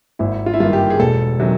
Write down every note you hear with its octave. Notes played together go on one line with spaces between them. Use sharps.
G#1 E4
F4
E4
G2 D#3 F4
G4
G#4
E1 A4
C3 D#3 F#3